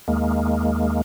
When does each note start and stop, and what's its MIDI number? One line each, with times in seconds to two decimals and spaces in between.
0.08 1.01 39
0.08 1.01 56
0.08 1.01 58